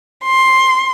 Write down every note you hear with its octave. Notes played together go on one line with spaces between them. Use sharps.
C6